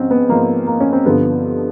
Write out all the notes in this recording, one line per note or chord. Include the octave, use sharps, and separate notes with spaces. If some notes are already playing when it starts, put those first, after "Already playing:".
Already playing: G#2 F3 C4 C#4
B3
G#2 F3 A#3
A#3
C#4
C4
G2 D3 F3 B3